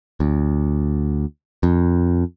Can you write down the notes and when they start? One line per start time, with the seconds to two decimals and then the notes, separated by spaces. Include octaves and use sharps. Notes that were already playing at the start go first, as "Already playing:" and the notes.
0.20 D2
1.63 F2